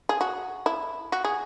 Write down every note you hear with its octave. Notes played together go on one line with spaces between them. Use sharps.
G#4
F#4
E4
F#4
G#4